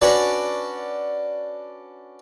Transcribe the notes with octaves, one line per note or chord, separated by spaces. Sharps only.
C#4 D4 F#4 B4 D5